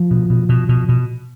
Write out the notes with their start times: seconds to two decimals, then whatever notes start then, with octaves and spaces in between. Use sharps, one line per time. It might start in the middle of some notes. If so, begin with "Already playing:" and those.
Already playing: F3
0.11 B2
0.30 B2
0.49 B2
0.69 B2
0.89 B2